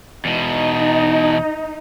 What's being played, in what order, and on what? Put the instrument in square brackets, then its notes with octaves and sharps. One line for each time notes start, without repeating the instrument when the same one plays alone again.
[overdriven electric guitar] E2 B2 [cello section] D#4